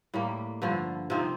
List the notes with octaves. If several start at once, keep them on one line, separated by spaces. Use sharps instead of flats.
A2 G3 A#3
G2 D3 F3
C3 F3 C4 D#4